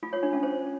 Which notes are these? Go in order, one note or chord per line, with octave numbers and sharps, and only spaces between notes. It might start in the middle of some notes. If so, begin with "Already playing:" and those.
F4
C#5
D4
C#4
C5